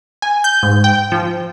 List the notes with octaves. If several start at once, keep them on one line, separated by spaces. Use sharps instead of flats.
G#5
G6
G#2
G5
F3